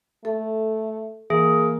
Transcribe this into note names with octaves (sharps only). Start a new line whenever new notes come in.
A3 A4
E3 A#3 G#4